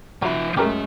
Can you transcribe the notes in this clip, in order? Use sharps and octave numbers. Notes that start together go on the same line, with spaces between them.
F3 F#3 E5 B5
F#2 G#3 A3 G4 A#4